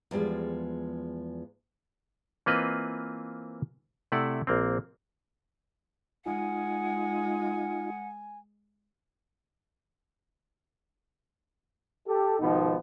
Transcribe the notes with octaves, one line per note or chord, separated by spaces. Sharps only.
E2 F3 G3 G#3
E3 A#3 C4 F4 B4 D#5
C3 A3 E4 D5 F#5
A#1 A#3 C4
G#3 D#4 F4 F#5 G#5
G4 A4
G#1 B2 D#3 F3 B3 D#4